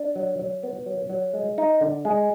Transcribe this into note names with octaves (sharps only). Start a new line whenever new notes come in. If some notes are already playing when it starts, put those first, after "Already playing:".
Already playing: D4
F#3
F#3
B3
F#3
F#3
G#3
D#4
D3
G#3